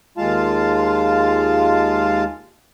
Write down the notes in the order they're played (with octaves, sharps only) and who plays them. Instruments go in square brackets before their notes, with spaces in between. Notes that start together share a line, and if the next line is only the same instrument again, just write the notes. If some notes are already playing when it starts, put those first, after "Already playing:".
[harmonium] D#2 G#3 F4 F5 A5